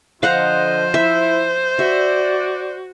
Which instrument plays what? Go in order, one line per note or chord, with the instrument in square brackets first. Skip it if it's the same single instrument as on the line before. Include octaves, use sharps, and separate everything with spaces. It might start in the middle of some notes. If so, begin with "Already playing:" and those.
[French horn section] D3 D#5 [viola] F3 [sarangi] C5 [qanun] F5 F#5 A#5
[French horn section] E4 [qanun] E5
[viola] F#4 [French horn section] D5 [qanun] E5